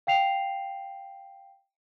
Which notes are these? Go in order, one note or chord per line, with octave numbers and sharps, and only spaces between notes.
F5 G5 C7 F7